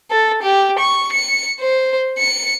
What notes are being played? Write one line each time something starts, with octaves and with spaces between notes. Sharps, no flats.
A4
G4
C#6
C#7
C5
C#7